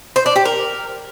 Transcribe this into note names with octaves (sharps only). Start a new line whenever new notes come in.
C5
D4
G4
A#4